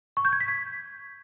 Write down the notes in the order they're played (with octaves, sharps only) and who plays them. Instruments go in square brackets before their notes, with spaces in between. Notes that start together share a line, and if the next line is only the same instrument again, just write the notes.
[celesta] C#6
G6
G#6
B6
G#6